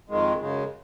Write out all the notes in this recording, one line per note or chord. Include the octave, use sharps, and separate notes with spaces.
F2 D#3 G#3
F#2 C#3 G#3